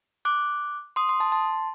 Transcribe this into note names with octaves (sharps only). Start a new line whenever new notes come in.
D6 F#6
C6 D#6
C6 D#6
A5 C6
A5 C6